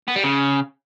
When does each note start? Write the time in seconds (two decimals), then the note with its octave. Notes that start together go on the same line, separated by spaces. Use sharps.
0.08 B3
0.16 G3
0.24 C#3